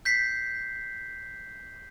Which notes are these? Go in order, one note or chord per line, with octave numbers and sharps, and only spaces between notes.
G6 B6 C7